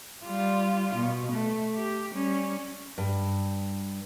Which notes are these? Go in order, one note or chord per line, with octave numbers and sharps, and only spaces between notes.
G3 F4
B2
A3
G4
G3 C#4
G2